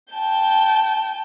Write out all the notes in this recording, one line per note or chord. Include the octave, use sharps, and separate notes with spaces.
G5 A5 G6